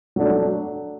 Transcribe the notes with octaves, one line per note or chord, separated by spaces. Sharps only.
F#3 A3 D4